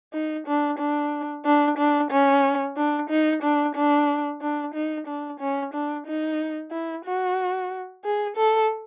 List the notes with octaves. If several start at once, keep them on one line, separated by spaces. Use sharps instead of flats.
D#4
D4
D4
D4
D4
C#4
D4
D#4
D4
D4
D4
D#4
D4
C#4
D4
D#4
E4
F#4
G#4
A4